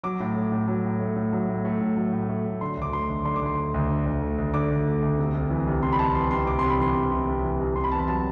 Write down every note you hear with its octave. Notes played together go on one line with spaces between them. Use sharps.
F#3 D6
A2
A3
A2
F#3
A2
A3
A2
F#3
A2
A3
A2
F#3
A2
A3
A2
D3 C6
D2 D6
A3 C6
D2
D3 C6
D6
D2 C6
A3
D2
D3
D2
A3
D2
D3 D6
D2
A3
D2
C3
C2
E3
C2
C3 C6
B5
C2 A5
E3 C6
C2 C6
C3 D6
C2 C6
B5
E3 C6
C2
C3
C2
E3
C2
C3 C6
B5
E2 A5
B5
F#3 A5